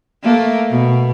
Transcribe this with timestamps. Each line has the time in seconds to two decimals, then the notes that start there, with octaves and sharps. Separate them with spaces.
0.23 A3 A#3
0.69 B2